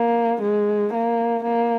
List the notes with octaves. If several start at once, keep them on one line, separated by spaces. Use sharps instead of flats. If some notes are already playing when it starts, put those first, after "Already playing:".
Already playing: A#3
G#3
A#3
A#3